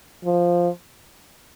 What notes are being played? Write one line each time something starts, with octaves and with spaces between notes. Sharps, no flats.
F3